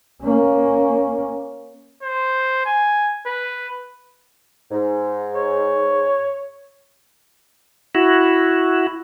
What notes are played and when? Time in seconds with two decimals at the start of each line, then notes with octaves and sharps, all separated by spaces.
0.22 A#3 C#4
2.03 C5
2.66 G#5
3.27 B4
4.71 G#2
5.34 C#5
7.95 E4 F#4